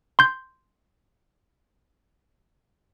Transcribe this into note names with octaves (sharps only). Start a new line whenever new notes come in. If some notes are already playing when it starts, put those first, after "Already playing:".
C6 G6